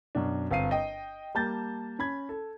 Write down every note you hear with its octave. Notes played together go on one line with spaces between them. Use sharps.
F#2 B2 D4
G1 C4 F5 C7 D#7
D#5 G5
G3 A#3 A5 G6 A6
C#4 B5 G#6
A4